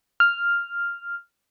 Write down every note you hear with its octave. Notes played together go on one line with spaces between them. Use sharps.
F6